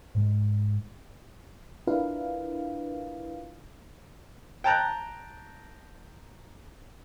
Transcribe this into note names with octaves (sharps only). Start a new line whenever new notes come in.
G#2 G#3
D4 E4 F4 A#4 B4 F5
G5 A5 A#5 F#6